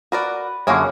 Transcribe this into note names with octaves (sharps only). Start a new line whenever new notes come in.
F#4 A#4 B4 D5
F#2 D3 A#3 C#4 F#4 G#4 C#5